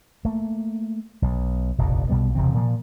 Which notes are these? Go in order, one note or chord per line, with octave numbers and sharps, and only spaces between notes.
A3 A#3
B1
F1 A#1 D#2 B2
B1 B2 G3 B3
D#1 C3 E3 C4
A#2 F3